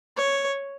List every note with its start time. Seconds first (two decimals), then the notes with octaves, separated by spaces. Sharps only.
0.17 C#5